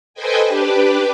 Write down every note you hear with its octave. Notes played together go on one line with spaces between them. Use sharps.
A4 B4 C5 D#5 G5 G#5
D4 G4 B4 D5